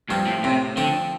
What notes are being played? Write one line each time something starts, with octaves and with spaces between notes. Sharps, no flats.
G2 F3 C4
A2
A2 C3
D3 F3 C4